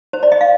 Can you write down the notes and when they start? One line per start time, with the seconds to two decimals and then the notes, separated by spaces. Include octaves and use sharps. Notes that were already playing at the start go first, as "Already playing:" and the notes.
0.13 C5
0.23 D5
0.32 D#5
0.41 F5